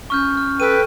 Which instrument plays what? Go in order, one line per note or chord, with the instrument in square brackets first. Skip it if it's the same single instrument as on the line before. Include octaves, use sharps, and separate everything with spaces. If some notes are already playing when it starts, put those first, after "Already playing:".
[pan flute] C#4 [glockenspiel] C#6 F6 G6
[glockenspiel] F6
[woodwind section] A4 G5 [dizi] B4 [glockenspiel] D#7